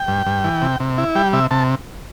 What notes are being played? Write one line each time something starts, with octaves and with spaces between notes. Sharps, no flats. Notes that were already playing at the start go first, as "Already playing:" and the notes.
Already playing: G5
G2
G2
E3
C3
C3
E4
G3 G5
C3 E5
C3 A5